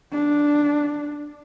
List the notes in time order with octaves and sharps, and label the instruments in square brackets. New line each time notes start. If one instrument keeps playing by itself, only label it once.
[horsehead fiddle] D4